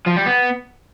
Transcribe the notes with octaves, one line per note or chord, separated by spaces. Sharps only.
F3
G3
B3